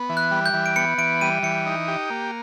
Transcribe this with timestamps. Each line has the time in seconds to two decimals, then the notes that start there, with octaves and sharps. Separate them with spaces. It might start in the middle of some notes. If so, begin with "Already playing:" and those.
Already playing: B3
0.09 E3
0.17 F#6
0.31 G3
0.46 G6
0.54 E3
0.66 D7
0.76 B3 C#7
0.98 E3 D7
1.21 G3 D#7
1.43 E3 C#7
1.66 D#4
1.88 G4
2.10 A#3